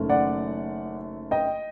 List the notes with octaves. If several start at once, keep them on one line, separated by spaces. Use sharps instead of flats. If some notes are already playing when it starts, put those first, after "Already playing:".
Already playing: F#1 F#2 D#3 A3
D5 F#5
D#5 G5